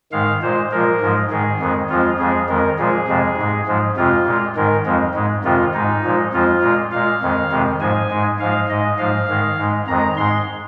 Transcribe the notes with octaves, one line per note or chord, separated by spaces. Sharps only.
G#2 D#3 G#3 F5
A#2 G#3 C5
A#2 F3 G#3 A#4
G#2 F3 G#3
G#2 D#3 G#3 G#4
F2 D#3 G#3
F2 F3 G#3 F4
F2 F3 G#3 G#4
F2 D#3 G#3 A#4
A#2 F3 G#3 G#4
F2 C3 F3 G#3
G#2 G#3
G#2 F3 G#3
F2 C3 G#3 F4
A#2 G#3
G#2 D#3 G#3 A#4
F2 F3 G#3
G#2 G#3
F2 C3 D#3 G#3 F4
G#2 G#3 D#4
A#2 F3 G#3
F2 F3 G#3 F4
A#2 G#3
A#2 G#3 F5
F2 D#3 G#3
F2 C3 D#3 G#3
G#2 F3 G#3 G#5
G#2 G#3
G#2 F3 G#3 F5
G#2 G#3 D#5
G#2 F3 G#3 F5
G#2 D#3 G#3
G#2 G#3
F2 D#3 G#3 A#5
G#2 G#3 C6